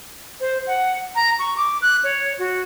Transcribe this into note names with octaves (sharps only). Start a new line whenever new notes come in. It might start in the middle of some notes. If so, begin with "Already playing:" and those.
C5
F#5
A#5
C#6
D6
F#6
C#5
F#4